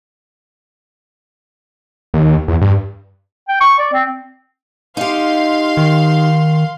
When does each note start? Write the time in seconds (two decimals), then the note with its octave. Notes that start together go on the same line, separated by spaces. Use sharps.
2.14 D#2
2.48 E2
2.61 G2
3.49 G5
3.61 C#6
3.79 D5
3.93 C4
4.97 D#4 G4 F5 C6
5.77 D#3